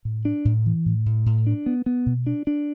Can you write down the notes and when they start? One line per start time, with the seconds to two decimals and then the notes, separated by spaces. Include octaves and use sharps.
0.05 A2
0.25 D4
0.45 A2
0.66 E3
0.86 A2
1.06 A2
1.26 A2
1.47 D4
1.66 B3
1.86 B3
2.06 B2
2.27 D4
2.47 D4